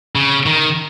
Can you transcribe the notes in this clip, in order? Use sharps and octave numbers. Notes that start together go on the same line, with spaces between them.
C#3
D#3